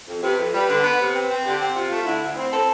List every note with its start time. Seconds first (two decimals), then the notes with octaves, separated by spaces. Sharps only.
0.08 F2
0.23 C3 B4
0.39 F2
0.54 G3 B4
0.69 D3
0.84 B3
1.00 C3
1.14 C4 B4
1.31 C4
1.45 D3 G4
1.60 C4
1.76 C3 F4
1.91 A3
2.06 D3 E4
2.22 D2
2.37 C4 E4
2.52 A4